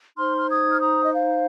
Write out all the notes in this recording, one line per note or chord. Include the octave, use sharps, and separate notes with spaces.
D#4 C5 C6 F6
F6
D#6 G#6
F6
A#5 D#6
D#5
F5